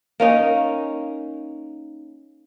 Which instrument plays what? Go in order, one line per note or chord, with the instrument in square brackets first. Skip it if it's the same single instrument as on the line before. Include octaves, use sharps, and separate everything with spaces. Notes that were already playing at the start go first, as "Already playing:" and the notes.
[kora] A#3 C#4 D#4